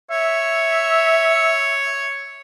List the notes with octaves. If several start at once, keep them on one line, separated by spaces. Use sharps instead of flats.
C#5 E5